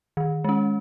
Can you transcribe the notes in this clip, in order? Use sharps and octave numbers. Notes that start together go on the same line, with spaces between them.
D#3
G#3 C#4